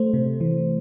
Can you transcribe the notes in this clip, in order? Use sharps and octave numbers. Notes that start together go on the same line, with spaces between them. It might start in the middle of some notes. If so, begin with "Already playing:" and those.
Already playing: A3 C5
C3
E3